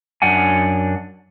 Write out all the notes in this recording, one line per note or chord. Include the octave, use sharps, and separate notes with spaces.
F#2 D4 F#5 G#5